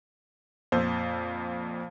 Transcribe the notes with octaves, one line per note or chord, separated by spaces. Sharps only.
F2 A#2 C5 E6